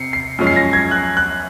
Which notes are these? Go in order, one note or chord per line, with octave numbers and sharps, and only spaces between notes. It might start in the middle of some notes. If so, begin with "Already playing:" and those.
Already playing: C3 C7 C#7
C7
F#2 F3 G#3 C#4
C7
A#6
G#6
F#6
F#6